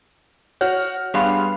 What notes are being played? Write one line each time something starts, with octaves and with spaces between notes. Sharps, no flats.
F#4 C#5 F#5 F6
G2 G3 B3 G#4 F5 C6